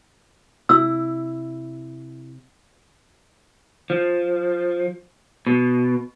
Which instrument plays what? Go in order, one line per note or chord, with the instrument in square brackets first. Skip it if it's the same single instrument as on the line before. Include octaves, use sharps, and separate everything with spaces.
[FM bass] C3 [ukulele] E4 [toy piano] E6
[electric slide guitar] F3
B2